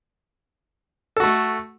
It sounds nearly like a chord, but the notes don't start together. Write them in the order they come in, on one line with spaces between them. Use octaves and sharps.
A4 F#4 A3